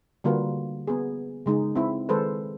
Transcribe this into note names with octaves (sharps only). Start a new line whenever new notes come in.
D3 G3 A#3 F4 F#4 B4
B3 G#4
C#3 G#3 D#4
C4 E4
D#3 G#3 A4 B4 C5